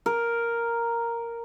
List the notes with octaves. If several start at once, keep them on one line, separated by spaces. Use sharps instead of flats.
A#4